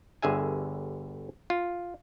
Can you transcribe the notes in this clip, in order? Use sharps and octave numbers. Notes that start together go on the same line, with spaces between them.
G1 D3 G#4 E5 G#5
F4